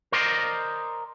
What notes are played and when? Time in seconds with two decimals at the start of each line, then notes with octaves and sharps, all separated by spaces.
0.12 A#4 C5 D5 D#5